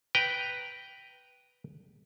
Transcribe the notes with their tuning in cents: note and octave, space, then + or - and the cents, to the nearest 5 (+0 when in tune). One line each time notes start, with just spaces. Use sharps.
B4 +0 G5 -10 A#5 +0